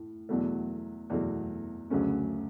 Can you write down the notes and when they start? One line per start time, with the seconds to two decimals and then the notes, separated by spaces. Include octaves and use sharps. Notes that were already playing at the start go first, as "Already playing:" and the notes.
Already playing: A2
0.29 E2 B2 F#3 A3
1.10 E2 B2 F#3 A3
1.90 D2 C#3 F#3 A3 C#4